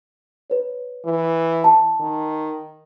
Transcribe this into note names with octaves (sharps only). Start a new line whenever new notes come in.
B4 C#5
E3
A5
D#3